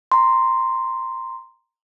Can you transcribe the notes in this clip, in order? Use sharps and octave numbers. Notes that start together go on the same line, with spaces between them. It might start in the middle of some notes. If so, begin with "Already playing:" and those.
A#5 C6